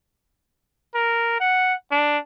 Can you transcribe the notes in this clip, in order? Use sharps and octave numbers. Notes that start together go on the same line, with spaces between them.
A#4
F#5
D4